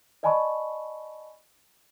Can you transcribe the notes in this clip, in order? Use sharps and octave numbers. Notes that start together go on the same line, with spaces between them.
D5 D#5 G#5 A5 B5 C#6